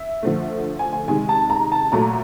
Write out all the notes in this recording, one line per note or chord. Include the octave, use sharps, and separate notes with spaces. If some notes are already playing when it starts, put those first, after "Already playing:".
Already playing: E5
D3 F3 A3
G#5
G#5
C3 D#3 G#3 G#5
A5
A#5
A5
A#2 F#3 A3 A#5